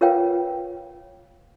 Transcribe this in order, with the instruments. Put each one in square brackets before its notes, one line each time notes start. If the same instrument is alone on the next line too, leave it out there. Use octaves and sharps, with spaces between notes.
[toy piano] F4 A#4 B4 C#5 F5 G5